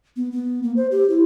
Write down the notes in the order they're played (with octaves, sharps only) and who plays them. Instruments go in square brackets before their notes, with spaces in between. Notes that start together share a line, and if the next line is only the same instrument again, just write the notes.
[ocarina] B3
B3
A#3
C5
G4
E4